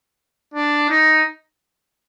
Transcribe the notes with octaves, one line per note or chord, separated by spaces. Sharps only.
D4
D#4